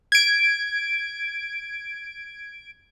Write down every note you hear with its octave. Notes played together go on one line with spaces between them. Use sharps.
G#6 D7